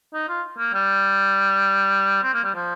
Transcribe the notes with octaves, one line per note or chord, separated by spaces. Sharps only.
D#4
F4
A#3
G3
C4
A#3
G3
F3